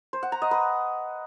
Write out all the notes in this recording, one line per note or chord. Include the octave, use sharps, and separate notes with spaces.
C5
F#5
A#5
D#5
B4